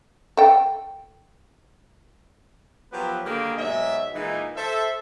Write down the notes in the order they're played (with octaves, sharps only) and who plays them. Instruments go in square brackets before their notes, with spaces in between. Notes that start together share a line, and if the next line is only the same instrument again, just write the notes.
[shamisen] A4 G5
[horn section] F3 F#3 B3 G4 A#4 B4
D3 D#3 G3 A#3 G4 G#4
G#2 B2 F#3 G#3 E5
A#2 E3 G#3 D#4
A4 C5 E5